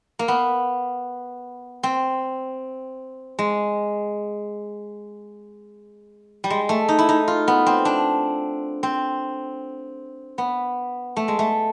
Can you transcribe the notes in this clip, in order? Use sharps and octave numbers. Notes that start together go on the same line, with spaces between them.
A#3
B3
C4
G#3
G3
G#3
A3
D#4
E4
D#4
F4
B3
C4
D4
C4
B3
A3
G#3
A3